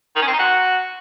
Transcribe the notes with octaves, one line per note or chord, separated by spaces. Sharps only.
D#3
C#4
C4
D#4
F#4